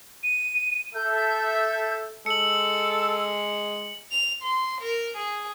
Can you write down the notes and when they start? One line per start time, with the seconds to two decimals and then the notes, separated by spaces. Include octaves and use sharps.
0.23 D#7
0.95 A4 E5 G6
2.26 G#3 A4 C#7 F#7
4.11 F7
4.43 C6
4.81 A#4
5.17 G#4